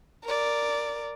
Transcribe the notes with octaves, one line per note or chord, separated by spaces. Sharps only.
A#4 D5